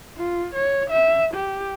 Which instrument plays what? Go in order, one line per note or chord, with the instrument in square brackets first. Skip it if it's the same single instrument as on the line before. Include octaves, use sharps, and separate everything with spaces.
[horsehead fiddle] F4
C#5
E5
G4